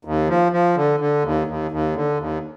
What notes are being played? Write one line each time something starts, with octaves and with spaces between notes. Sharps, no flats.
D#2
F3
F3
D3
D3
D#2
D#2
D#2
D3
D#2